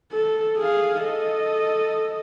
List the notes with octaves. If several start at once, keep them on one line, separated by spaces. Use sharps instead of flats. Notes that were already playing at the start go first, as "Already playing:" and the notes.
A4
G#4 F5
A4 D#5